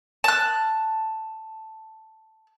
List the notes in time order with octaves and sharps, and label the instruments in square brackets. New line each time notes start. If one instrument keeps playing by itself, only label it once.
[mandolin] A5 F#6